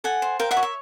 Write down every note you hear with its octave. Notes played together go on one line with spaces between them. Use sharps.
A4 F#5 G#5
C5
A#4 F5 G5
E5 F#5
C#5
E5